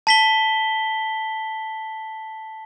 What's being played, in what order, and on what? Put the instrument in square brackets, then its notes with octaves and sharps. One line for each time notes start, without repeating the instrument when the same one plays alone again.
[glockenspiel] A5 B6 G7